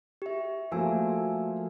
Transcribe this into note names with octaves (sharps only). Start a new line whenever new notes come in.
G4 E5
F3 A3 A#3 F#4 G#5 E6